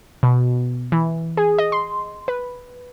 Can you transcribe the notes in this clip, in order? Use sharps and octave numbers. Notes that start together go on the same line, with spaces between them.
B2
E3
G#4
D#5
C6
B4